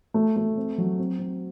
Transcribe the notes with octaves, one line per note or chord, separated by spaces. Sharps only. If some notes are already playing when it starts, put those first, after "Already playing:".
A3
A3
C4
F#3
C4
C4